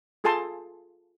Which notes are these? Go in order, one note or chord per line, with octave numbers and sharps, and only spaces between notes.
F4 G#4 A4 G#5 A5 C6